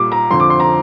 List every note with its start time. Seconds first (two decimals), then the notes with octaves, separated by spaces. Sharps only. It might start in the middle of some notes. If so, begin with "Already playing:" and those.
Already playing: A#2 G3 D6
0.12 A#5
0.30 F2 D3 F3 C6
0.40 D6
0.50 C6
0.60 A#5